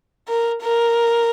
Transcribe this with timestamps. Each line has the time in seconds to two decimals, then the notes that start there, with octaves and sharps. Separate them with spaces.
0.28 A#4
0.62 A#4